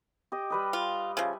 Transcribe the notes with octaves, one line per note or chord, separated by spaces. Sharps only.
G4 D#5
G3 B4 D#5
F4
C#3 F3 E5